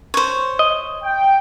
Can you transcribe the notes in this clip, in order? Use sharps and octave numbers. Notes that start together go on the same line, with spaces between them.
C5 C#5
D#5
G5